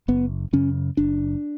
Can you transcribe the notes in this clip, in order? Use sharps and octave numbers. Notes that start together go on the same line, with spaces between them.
F#1 B3
F#2 C#3 C#4
F#1 D4